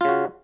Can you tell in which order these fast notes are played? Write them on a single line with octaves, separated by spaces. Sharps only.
F4 C#3 F#4